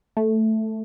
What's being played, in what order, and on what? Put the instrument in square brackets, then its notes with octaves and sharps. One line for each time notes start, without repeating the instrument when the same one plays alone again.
[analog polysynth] A3